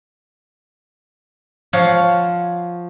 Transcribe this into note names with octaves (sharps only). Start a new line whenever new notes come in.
F3 C#5 F5 F#5